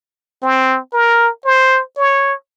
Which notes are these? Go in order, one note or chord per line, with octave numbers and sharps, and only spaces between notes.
C4
A#4
C5
C#5